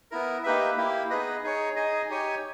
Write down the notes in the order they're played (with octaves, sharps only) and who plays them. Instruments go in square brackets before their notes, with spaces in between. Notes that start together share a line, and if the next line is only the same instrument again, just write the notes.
[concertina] B3 E4 A#4
A#3 D#4 G4 B4 E5
A#3 E4 G4
B3 D#4 G#4 B4 D#5
D#4 G#4 C#5
D#4 G#4 D#5 G#5
D#4 G4 C#5 G#5